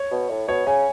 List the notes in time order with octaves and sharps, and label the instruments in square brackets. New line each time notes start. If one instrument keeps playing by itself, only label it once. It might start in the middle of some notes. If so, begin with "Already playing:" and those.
Already playing: [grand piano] C#5
[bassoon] B2
A2
[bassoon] B2 [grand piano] C#5
[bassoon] C#3 [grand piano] G#5